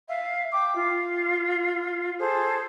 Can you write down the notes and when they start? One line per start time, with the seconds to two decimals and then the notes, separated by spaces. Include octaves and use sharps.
0.09 E5 F5
0.51 G5 D6
0.76 F4
2.20 G#4 A4 C5